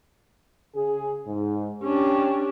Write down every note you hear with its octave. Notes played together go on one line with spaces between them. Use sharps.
C#3 G#4
G#2
C#4 D4 G4